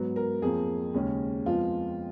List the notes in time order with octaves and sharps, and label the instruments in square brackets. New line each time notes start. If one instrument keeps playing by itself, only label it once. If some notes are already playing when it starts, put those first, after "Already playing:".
Already playing: [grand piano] G#2 F#3 B3
A#4
F2 F3 A#3 G#4
D#2 C#3 G#3 C#4
F2 F3 G#3 B3 F4